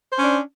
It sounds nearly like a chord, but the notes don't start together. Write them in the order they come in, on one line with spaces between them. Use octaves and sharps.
C5 C#4 D4